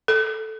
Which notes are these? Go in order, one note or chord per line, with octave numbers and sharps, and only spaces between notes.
A4